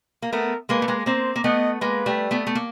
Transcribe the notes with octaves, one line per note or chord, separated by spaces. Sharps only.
A#3
A3 B3 A#4
G#3 A#3 B4
A3
G#3 A#3
A#3 C4 C5
A#3
A3 B3 D#5
G#3 A#3 B4
G3 A3
A3 B3
A3
A#3